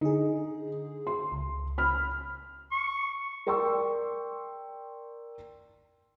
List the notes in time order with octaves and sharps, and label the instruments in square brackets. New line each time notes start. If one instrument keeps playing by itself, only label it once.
[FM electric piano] D3 G#4 [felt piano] D#4
[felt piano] C6
[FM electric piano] C#2
[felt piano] B5 F6
[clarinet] C#6
[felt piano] A#4 D5 G5 C6 C#6 E6